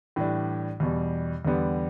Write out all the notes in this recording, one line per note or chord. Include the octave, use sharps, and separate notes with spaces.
A2 E3 G3 D4
E2 B2 G3
E2 D3 G3 B3